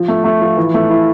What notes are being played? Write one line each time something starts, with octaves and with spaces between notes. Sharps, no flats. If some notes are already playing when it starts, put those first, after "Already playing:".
Already playing: F3
A3
A3
F3
E3
A3
E4